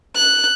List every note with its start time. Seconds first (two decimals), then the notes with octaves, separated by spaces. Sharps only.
0.16 F#6